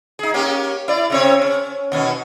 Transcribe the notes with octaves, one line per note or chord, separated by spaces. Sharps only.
D#4 G#4
A#3 C#4 G4
E4 D5
C#3 C4 C#5
C#4
D#2 B2 C#4